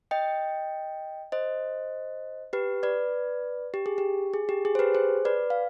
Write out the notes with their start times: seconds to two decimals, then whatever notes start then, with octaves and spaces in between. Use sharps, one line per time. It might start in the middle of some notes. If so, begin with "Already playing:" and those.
0.11 D#5 G5
1.32 C5 D#5
2.53 G4 B4
2.83 B4 D5
3.74 G4
3.86 G#4
3.98 G4
4.34 G#4
4.49 G4
4.65 G#4
4.75 C5
4.79 G4 B4
4.95 G#4 C5
5.25 B4 D5
5.50 F5